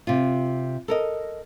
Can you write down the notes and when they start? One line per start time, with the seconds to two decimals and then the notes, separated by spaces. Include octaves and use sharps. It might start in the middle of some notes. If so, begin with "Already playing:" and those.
0.07 C3 F4
0.88 A4 A#4 D#5